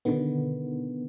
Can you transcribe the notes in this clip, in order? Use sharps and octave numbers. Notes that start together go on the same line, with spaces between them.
B2 D3 D#3 B3